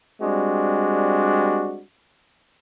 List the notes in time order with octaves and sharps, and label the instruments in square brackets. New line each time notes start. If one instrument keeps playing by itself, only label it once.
[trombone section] G3 G#3 C4 D4 F#4